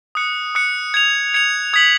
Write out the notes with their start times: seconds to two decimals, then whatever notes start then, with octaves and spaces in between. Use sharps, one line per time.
0.15 D#6 F#6 C#7
0.55 D#6 F#6 C#7
0.94 G#6 C#7 F7
1.34 G#6 C#7 F7
1.73 D#6 G#6 B6 F#7